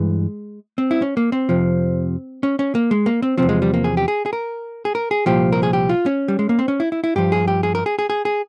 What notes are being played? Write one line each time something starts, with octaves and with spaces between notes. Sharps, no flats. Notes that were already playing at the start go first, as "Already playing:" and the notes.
Already playing: G2 E3 G#3
C4
E4
C#4
A#3
C4
F2 C3 F3
C#4
C#4
A#3
G#3
A#3
C4
E2 C3 F3 C4
G#3
G3
A#3
G#4
G4
G#4
G#4
A#4
G#4
A#4
G#4
C2 A#2 F3 G4
A#4
G#4
G4
F4
C#4
G3
G#3
A#3
C4
C#4
E4
E4
E4
G2 F3 G4
G#4
G4
G#4
A#4
G#4
G#4
G#4
G#4